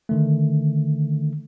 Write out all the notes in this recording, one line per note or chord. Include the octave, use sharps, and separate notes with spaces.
D3 D#3 A3